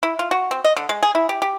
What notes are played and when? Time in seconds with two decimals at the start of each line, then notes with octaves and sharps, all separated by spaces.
0.03 E4
0.19 F4
0.31 F#4
0.51 C4
0.64 D#5
0.77 D3
0.89 G#3
1.03 G#4
1.15 E4
1.29 G4
1.42 G4